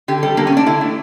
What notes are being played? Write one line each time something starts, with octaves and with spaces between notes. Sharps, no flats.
D3 G4
G3 A4
D3 A#3
C#4
A3 D4
D3 E4
A3